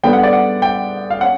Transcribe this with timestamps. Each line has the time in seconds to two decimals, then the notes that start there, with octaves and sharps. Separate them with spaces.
0.03 D3 G3 B3 D4 G5
0.13 F#5
0.23 D5
0.33 F#5
0.62 G5
1.10 F5
1.21 C#4 F#5